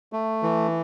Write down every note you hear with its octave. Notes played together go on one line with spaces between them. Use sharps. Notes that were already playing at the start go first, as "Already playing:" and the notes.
A3
E3